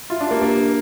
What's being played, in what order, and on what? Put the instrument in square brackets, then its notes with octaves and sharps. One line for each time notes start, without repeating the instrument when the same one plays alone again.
[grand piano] F4 [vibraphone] E5
[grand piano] D4
[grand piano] A#3 [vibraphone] G4
[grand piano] A#3 [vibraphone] D4
[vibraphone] D4